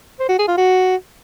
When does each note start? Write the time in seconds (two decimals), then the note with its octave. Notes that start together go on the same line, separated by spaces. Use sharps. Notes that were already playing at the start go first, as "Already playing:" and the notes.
0.20 C5
0.29 F#4
0.39 G#4
0.48 F4
0.57 F#4